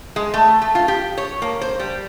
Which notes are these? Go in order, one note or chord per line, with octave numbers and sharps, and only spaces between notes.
G#3
A3
A3
F4
G4
C#5
A#3
C5
G3